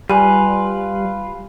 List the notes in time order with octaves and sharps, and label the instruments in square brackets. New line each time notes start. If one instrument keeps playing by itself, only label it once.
[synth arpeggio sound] G3 [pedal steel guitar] F4 B4 [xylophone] G#5 D#7